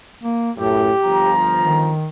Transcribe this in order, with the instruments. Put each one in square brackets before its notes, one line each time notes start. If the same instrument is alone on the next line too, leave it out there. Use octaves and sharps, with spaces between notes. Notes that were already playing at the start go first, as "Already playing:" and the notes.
[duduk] A#3
[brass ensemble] F#2 A2 [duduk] G4
[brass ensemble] G1 F3 A#5
[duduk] D#3